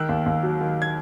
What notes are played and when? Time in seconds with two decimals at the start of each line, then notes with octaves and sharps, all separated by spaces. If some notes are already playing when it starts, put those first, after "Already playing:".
Already playing: D#3 E6 F#6
0.09 D#2
0.26 D#2
0.43 F#3
0.61 D#3
0.82 G#6